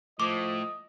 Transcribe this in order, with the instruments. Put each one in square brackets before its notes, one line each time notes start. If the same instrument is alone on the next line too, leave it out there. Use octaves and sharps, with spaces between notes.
[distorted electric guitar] A2 [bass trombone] F3 [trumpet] D#5 [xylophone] D6